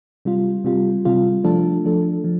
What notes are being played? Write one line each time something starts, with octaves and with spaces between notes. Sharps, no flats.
C3 G3 F4
C3 G3 F4
C3 G3 F4
F3 A3 D4 A4
F3 A3 D4 A4
F3